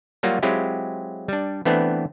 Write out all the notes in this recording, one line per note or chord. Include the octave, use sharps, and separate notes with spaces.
F#3 G3 A#3 F4 F#4
F#3 G#3 C4 E4 F4 G4
G3 D4
E3 A3 B3 C4 D4